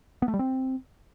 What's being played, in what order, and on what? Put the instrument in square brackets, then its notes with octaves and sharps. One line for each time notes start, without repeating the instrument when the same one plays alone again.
[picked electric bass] B3
A3
G3
C4